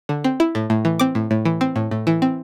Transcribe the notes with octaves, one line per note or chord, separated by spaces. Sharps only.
D3
C4
E4
A2
A2
E3
C4 D6
A2
A2
E3
C4
A2
A2
E3
C4